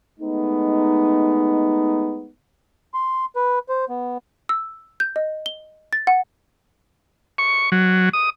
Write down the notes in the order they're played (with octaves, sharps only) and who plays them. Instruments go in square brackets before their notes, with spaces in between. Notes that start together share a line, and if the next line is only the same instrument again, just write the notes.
[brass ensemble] G#3 A3 B3 D#4
[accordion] C6
B4
C5
B3
[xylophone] E6
G6
D#5
G7
A6
F#5
[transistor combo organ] C#6
F#3
D#6